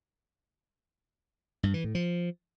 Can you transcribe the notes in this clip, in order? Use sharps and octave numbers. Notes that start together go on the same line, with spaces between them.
G2
E3
A2
F3